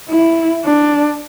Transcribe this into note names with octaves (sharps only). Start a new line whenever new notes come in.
E4
D4